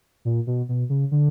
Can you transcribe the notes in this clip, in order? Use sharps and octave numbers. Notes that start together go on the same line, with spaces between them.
A#2
B2
B2
C#3
D3